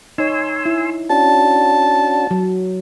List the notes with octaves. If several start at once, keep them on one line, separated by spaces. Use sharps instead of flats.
D#4 C#5 G#5 C6 E6
E4
C#4 D4 F#4 A5
F#3